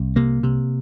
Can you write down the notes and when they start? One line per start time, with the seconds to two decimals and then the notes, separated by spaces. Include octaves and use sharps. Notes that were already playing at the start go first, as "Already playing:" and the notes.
Already playing: C2
0.16 C3 A#3
0.43 C3